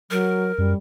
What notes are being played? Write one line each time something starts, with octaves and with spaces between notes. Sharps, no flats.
F#3 A#4
F#2 G3